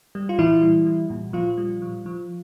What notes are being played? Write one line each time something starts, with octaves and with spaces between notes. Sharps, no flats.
G3
F4
A#2 E3 E4
G3
G3
A#2
A#2 F3 F4
G3
F3
F3